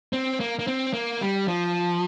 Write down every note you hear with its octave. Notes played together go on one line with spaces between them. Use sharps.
C4
A#3
A#3
C4
A#3
G3
F3